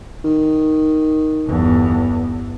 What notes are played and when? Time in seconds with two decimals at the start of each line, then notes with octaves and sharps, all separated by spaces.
0.24 D#3
1.46 G1 E2